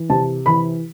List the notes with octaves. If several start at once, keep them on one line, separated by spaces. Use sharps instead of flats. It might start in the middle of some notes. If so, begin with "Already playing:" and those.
Already playing: E3
C3 A5
E3 B5